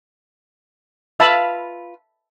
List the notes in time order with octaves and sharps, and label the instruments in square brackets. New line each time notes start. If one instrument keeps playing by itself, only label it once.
[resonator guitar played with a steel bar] F4 B4 F5 [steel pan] E5 A5 B5